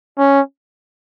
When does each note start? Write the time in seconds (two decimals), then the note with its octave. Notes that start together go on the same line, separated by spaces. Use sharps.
0.18 C#4